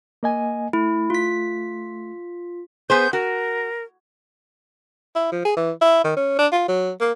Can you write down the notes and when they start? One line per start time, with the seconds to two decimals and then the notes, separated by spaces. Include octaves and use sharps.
0.23 A#3 D#5 G#5
0.73 A3 E4
1.10 F4 B6
2.90 B3 G#4 C5 G6
3.13 F#4 A#4
5.15 E4
5.32 F3
5.45 G#4
5.57 E3
5.81 E4
6.04 D#3
6.17 C#4
6.39 D4
6.52 F4
6.68 F#3
7.01 A#3